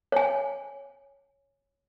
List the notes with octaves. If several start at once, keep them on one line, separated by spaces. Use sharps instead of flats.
C#5 G#5